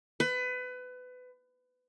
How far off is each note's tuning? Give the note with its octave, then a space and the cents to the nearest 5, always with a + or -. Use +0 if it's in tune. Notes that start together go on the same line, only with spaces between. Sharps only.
B4 +25